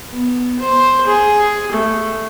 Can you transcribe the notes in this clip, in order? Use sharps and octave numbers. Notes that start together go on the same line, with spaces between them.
B3
C5
G#4
A3